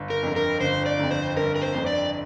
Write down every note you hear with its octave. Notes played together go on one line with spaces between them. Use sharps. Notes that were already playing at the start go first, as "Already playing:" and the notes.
Already playing: G1
A#4
F2 D3
A#4
G1 C5
D5
F2 D3
C5
G1 A#4
A#4
C5
F2 D3
D5